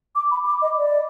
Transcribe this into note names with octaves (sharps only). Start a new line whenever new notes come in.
D6
B5
D6
D#5
D5